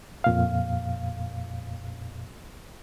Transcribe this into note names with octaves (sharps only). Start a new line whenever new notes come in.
F2 A#2 F5